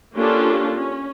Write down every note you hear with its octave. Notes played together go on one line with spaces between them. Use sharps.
A#3 C#4 D4 F4 G4 A4
C#4